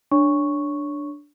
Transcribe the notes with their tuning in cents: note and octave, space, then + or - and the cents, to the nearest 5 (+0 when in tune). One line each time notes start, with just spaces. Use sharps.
D4 +0 C#5 +15 C#6 +0